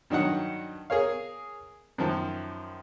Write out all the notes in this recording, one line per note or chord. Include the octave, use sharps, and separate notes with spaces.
G2 D#3 F#3 D#4 F#5
G#4 A#4 C#5 F5
F#2 D#3 F3